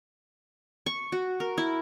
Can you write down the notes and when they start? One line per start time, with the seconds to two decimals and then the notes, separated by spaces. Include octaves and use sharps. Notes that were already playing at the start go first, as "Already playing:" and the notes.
0.86 C#6
1.12 F#4
1.40 A#4
1.58 E4